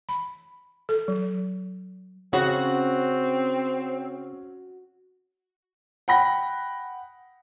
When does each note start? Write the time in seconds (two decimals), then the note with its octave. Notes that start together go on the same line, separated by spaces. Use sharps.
0.09 B5
0.89 A4
1.08 F#3
2.33 C#3 C4 C#4 F#4
6.08 F#5 G5 B5 A#6